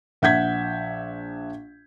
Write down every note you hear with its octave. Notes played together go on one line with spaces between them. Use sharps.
A#1 E5 F#5 G6 G#6 B6